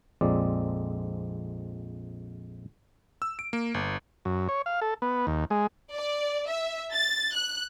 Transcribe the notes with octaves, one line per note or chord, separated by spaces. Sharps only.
A#1 F2 G#3 C4 D5
E6
D7
A#3
G1
F#2
C#5
F5
A4
B3
D#2
G#3
D5
E5
A6
F#6